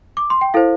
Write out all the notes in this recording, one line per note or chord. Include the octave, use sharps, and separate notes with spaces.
D6
C6
G5
E4 A4 C5 F5